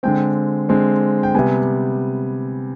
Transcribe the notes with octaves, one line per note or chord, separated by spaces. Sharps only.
D3 G#3 C4 G5
D3 G#3 C4
G5
C3 G3 B3 G#5